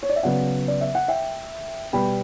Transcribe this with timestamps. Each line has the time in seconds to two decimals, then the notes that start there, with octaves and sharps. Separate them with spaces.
0.03 C#5
0.09 D5
0.16 E5
0.23 C#3 F#3 B3 D5 F#5
0.68 D5
0.81 E5
0.95 F#5
1.08 E5 G5
1.93 B2 G3 B3 G5 B5